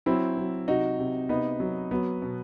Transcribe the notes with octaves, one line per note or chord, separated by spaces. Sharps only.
F#3 C4 E4
F#3
C3 D#4 F#4
C3
C3 B3 D#4
F#3
F#3 B3
B2